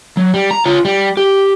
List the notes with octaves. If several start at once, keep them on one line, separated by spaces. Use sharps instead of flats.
F#3
G3
A#5
F4 C#5
G3
G4